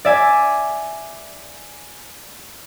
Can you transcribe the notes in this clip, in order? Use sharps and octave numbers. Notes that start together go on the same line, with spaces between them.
D5 E5 G#5